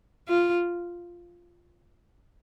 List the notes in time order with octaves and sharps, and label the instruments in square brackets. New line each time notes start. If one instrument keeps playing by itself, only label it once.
[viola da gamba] F4